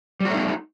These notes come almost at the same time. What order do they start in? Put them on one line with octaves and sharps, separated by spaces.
G3 F#4 A3 D#4